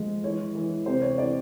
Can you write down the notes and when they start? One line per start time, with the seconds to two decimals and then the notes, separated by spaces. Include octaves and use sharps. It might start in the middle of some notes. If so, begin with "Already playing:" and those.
Already playing: F3 G#3
0.24 E3 C#5
0.55 E3
0.86 C3 C5
1.02 C#5
1.18 E3 D5